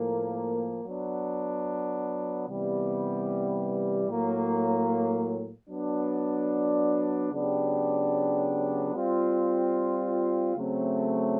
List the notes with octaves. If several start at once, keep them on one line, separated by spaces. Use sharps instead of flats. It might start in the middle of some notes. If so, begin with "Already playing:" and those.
Already playing: A2 F3 A#3
F#3 B3 D4
C3 E3 G3 B3
A2 F#3 A#3
F#3 B3 D4
C#3 F#3 B3 D4 G4
G3 C4 F4
C#3 F#3 A3 C4